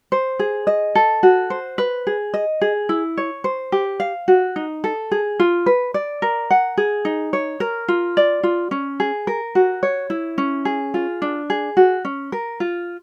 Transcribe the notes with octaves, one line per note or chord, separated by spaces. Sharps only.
C5
G#4
D#5
A4
F#4
C5
B4
G#4
D#5
G#4
E4
C#5
C5
G4
F5
F#4
D#4
A4
G#4
F4
B4
D5
A#4
F#5
G#4
D#4
C#5
A#4
F4
D5
F4
C#4
G#4
A#4
F#4
C#5
E4
C#4
G#4
F4
D4
G#4
F#4
C#4
A#4
F4